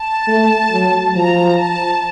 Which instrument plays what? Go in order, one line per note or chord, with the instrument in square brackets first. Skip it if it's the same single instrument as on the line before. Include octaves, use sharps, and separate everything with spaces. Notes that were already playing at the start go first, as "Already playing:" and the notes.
Already playing: [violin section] A5
[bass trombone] A3
F#3
[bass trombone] F3 [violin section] A#5
[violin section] A5